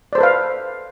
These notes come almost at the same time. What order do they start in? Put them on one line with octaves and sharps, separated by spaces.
D5 C5 A4 B4 F5